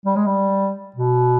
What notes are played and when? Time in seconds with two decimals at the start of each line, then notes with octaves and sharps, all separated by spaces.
0.05 G3
0.16 G#3
0.26 G3
0.96 B2